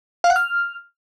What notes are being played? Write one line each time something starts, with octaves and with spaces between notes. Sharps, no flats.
F5
F#5
F6